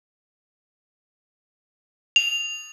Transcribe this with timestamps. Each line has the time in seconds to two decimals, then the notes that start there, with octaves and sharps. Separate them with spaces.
2.16 F7